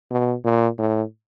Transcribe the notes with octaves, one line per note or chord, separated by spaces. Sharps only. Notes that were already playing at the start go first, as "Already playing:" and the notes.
B2
A#2
A2